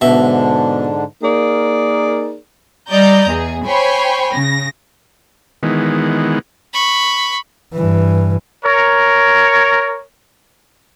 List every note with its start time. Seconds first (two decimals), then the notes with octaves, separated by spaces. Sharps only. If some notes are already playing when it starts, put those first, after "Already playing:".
0.01 G#2 B2 D3 D4 E5
1.23 A#3 D#4 G#4 A#4 D5
2.90 G3 D5 D#5 A#5 G6
3.27 E2 G#4
3.66 C5 C#5 G5 G#5 B5 C#6
4.35 C#3 A#6
5.63 D#3 E3 G#3 B3
6.73 B5 C#6
7.74 G2 E3
8.64 A#4 C#5